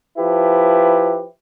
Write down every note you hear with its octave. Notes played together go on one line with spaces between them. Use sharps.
F3 E4 G4 B4